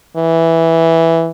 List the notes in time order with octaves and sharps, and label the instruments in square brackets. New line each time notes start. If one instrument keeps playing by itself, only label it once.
[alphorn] E3